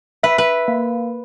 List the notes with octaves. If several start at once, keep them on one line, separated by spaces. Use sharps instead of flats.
B4 E5
B4
A#3